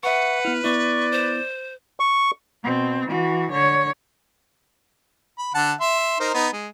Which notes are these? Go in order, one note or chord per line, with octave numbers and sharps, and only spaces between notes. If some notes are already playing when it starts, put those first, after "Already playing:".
B4 E5 F#5 C#6
B3 E4 F6
B3 E4 D5 C#6
C5
C#6
B2 C4
E3 F#4
D3 C#5
B5
D3 F#5 A5
E5 C6
D#4 A#4 C5
B3 D#4
G#3